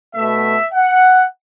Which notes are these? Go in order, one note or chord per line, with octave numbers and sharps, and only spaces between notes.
B2 A3 E5
F#5